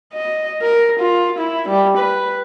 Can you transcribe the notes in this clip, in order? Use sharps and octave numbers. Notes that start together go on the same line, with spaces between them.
D#5
A#4
F4
E4
G3
B4